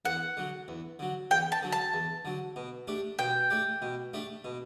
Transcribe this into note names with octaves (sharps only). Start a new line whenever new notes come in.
E2 F#5
D3 F#3
E2
D3 F#3
E2 G5
A5
D3 F#3
A5
E2
D3 F#3
B2
A3 D4 G4
B2 G5
A3 D4 G4
B2
A3 D4 G4
B2